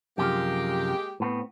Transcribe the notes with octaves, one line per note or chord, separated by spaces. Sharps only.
F#2 C3 F3 G#3 A#3 G4
A2 B3 C4